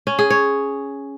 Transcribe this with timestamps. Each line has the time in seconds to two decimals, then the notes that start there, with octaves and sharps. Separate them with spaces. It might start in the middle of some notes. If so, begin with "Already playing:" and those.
0.07 C#4
0.19 G#4
0.30 C#5